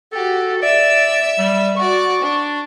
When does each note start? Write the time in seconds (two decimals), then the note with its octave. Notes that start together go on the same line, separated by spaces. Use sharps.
0.12 F#4 G4 A4
0.62 D5 E5 E6
1.39 G3
1.77 F#4 D5 C#6
2.21 D4